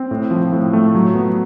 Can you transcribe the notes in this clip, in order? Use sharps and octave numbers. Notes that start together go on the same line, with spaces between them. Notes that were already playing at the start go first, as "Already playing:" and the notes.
Already playing: C4
A2
F3
A2
A3
F#3
B3